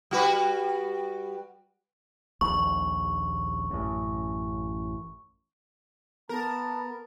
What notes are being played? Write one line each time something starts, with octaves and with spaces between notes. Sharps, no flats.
G3 F#4 B4
D#1 A#1 D#2 C#6
A1 F#2
B3 A#4 A5